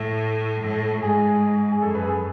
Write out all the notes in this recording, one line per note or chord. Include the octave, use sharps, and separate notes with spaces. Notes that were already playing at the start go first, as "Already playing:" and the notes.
Already playing: A2 E5
A2
G#2 G#4
G#4
F#2 A4
B4
G#4
A4